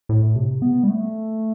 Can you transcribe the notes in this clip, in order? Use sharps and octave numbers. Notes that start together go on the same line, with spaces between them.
A2
C3
B3
G3
A3